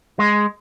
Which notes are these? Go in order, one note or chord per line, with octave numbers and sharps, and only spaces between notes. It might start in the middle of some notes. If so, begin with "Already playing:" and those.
G#3